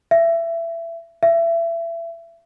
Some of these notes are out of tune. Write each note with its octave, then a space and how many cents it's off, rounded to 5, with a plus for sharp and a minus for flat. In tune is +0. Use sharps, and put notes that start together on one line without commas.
E5 +20
E5 +25